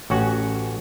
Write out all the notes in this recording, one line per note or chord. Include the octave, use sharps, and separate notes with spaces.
A1 C#4 F#4 F#5